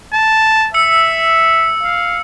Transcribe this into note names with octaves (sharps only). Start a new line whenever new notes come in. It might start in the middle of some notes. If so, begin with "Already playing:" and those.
A5
E5 E6 C#7
F5